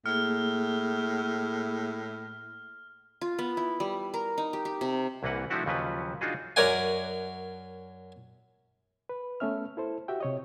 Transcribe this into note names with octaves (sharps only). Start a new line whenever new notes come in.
A2 A#3 G#4 F6
F4
B3
E4
G3
A#4
D#4
G4
G4
C3
C2 E3 A#3 B4 F#5
F3 A3 D4 E4 F#4 G4
D#2 C#3 F3 F#3 B4
D4 D#4 F4 F#4 G#4 D#5
F#2 A#4 C#5 D5 F#5 G#5
B4
A3 B3 C#4 E5 F6
E4 A4 C5
F#4 G4 E5 G5
C3 C#5 D#5